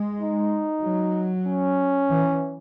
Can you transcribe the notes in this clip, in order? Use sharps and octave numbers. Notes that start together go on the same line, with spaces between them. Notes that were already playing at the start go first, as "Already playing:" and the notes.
Already playing: G#3
D#4
F#3
C#4
E3